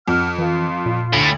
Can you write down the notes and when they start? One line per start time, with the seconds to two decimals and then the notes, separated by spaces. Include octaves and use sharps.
0.08 F2 F#5 F6
0.38 E3 F4
0.86 A#2
1.13 D2 A2